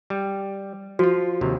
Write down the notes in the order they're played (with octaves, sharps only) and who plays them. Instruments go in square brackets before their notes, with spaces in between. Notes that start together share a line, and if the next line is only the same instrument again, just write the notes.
[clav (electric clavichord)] G3
[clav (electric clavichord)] F3 F4 [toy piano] F#4
[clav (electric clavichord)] D#2 C3